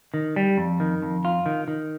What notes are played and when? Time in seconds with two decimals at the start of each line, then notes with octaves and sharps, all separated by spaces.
0.14 D#3
0.36 G3
0.58 F2
0.80 D#3
1.02 F2
1.25 F4
1.46 D#3
1.68 D#3